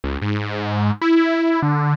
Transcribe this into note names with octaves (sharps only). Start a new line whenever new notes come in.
C#2
G#2
E4
D3